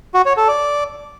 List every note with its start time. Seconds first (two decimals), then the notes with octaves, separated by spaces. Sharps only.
0.14 F#4
0.26 C#5
0.37 A4
0.48 D5